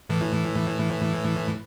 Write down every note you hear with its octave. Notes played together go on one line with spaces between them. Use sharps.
A2 E3